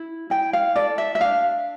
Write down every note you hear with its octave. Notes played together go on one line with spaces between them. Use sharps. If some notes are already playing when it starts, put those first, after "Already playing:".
Already playing: E4
E4 G5
F5
A4 D5
E5
E5
D4 F5